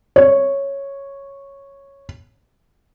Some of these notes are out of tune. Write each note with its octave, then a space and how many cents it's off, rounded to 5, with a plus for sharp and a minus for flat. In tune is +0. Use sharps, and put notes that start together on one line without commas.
C#5 -5